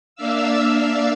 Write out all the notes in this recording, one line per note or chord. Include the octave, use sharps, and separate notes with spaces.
A#3 D4 D5 E5 F5 E6